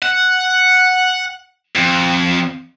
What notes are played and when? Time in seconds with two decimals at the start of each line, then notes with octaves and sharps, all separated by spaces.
0.02 F#5
1.76 F2